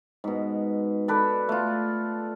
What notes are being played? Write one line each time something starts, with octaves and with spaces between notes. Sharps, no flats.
G#2 B2
A4 B4 D5
A3 F4